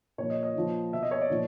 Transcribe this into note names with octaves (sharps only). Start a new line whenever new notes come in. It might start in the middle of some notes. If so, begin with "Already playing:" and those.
A#2 F3 C#5
D#5
D#5
A#2 F3
B2 E5
D#5
C#5
D5
A#2 F3